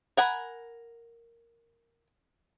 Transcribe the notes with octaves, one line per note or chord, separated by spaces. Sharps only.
A#4 F#5 G#5 B5